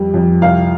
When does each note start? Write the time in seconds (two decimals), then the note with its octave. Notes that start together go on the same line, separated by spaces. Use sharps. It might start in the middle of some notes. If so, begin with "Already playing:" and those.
Already playing: F2 G3
0.14 F2
0.42 C2 F5